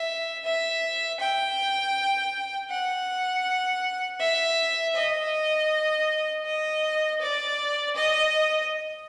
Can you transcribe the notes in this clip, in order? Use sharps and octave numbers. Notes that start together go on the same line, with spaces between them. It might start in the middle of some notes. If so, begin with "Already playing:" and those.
Already playing: E5
E5
G5
F#5
E5
D#5
D#5
D5
D#5